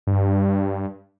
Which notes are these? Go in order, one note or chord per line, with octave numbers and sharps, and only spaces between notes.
G2